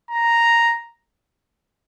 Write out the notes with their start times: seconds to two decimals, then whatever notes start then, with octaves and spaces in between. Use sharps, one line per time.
0.11 A#5